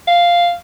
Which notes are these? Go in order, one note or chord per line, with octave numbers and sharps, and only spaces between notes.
F5